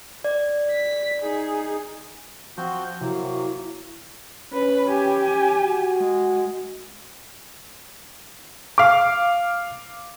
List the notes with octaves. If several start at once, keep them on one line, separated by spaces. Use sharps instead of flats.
D5
B6
D#4 G#4
F3 C4 F#4 G6
C3 F#3 A#3 E4 F#4
C#4 B4
G4 G#5
F#4
G#3
F5 D6